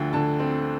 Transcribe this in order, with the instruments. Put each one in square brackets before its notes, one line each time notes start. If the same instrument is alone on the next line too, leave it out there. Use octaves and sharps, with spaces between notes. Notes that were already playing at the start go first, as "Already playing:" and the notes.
Already playing: [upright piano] D2 D3 F3 G5
D3 A5
C4